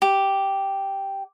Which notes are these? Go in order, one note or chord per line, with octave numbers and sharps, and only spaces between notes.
G4